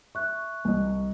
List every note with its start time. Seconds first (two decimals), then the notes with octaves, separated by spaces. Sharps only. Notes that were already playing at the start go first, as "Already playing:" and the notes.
0.15 E5 C#6 F#6
0.65 C2 D#5